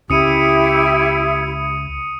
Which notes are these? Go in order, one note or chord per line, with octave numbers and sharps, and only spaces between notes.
C#2 C#4 E4 G4 D#6 C#7 D#7